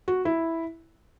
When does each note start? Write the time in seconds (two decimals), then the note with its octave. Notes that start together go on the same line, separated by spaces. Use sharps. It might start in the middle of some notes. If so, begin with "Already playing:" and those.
0.08 F#4
0.25 E4